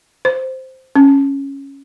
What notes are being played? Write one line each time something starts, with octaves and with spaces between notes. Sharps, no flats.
C5
C#4